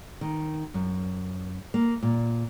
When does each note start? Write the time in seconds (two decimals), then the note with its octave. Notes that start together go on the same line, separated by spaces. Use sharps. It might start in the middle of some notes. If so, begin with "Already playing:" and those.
0.21 D#3
0.74 F#2
1.74 A#3
2.03 A#2